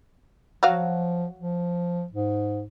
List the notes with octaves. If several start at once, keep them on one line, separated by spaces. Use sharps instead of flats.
F3 F#3 F#4 F5
F3
G#2